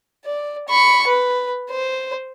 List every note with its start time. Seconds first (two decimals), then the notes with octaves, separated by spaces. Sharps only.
0.26 D5
0.68 B5 C#6
1.07 B4
1.71 C5